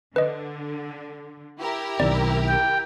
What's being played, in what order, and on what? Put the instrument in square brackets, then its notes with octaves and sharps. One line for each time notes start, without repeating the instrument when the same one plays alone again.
[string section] D3 [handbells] B4 D#5
[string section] E4 G4 A#4
[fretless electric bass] B1 D#3 C4 [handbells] D5
[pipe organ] G5